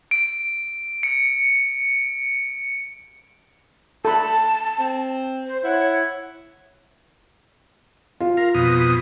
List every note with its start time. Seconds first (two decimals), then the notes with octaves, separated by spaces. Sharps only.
0.11 D7
1.03 C#7
4.05 A4 A5 B5
4.79 C4
5.46 C5
5.64 E4 C#5 F#5
8.20 F4
8.37 A#4 F5
8.55 F2 B2 D#6